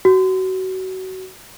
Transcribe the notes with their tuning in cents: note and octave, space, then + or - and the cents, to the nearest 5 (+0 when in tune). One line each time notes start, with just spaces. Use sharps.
F#4 +25